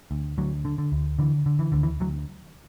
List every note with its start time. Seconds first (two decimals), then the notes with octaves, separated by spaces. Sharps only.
0.11 D2
0.38 D2 F#3
0.65 D3
0.78 D3
0.92 D2
1.19 D3 E3
1.46 D3
1.59 E3
1.72 D2 D3
1.83 E3
2.00 D2 F#3